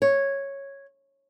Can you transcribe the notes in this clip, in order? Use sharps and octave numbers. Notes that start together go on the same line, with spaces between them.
C#5